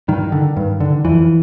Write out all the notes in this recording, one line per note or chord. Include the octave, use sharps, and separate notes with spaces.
G2 D#3
D3
G2
D3
F2 E3